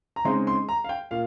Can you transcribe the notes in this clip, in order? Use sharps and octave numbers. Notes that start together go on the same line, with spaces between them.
A#5
C#3 G#3 C4 D#4 C6
C6
A#5
F5
G5
A#2 F5